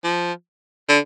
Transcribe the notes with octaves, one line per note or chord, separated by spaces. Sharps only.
F3
D3